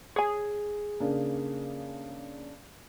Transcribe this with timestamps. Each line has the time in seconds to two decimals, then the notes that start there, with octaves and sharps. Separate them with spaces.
0.16 G#4 C#5 G#5
1.00 C#3 A#3 D4